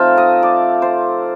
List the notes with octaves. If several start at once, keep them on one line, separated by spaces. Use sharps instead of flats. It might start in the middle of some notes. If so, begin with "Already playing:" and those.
Already playing: F3 A3 C4 D#4 F5 G5 A5
D#5
D5
C5